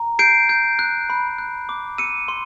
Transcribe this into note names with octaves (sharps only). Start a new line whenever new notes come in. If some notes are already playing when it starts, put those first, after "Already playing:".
Already playing: A#5
G6 C7 D7
G6
F#6
B5
F#6
D6
E6 C#7 D#7
C6